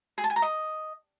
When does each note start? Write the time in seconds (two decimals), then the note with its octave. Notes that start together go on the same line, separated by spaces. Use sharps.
0.18 G#4
0.24 A5
0.30 G#5
0.36 A#5
0.42 D#5